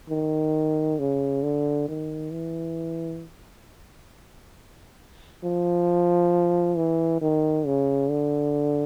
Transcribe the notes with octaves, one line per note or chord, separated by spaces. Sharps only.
D#3
C#3
D3
D#3
E3
F3
E3
D#3
C#3
D3